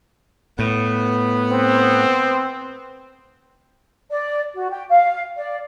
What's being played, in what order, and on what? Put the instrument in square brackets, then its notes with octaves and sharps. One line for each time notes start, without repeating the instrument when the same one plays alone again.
[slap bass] A2 [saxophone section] B3
[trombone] C4
[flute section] D5
F#4
G5
F5
D5